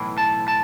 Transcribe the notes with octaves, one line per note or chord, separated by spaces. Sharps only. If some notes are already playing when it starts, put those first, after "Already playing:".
Already playing: B1 A2 E3
A5
A5